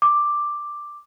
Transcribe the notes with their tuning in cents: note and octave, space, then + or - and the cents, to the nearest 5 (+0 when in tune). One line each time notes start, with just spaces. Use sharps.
D6 +5